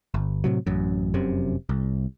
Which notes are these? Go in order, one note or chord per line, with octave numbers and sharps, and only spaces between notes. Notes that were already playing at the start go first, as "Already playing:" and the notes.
G1
A2 C3 F#3
A1 F#2
F1 F#2 C3
C2